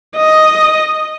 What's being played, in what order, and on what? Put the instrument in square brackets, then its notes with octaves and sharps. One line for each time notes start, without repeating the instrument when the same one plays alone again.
[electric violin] D#5